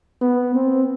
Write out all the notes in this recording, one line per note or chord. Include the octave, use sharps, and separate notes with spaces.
B3
C4